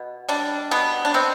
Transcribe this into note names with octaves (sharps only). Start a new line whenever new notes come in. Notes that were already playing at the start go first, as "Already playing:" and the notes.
Already playing: B2
G3 D4
B2 B3
D4
B3 C4